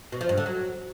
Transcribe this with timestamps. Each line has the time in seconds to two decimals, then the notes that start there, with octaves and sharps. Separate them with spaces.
0.12 B2
0.21 F3
0.29 G2
0.37 D3
0.46 F#3